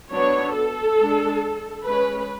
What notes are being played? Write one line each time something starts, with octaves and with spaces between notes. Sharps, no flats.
F#3 B3 D4 C#5
A4
G#3 D4
G#3 C#4 B4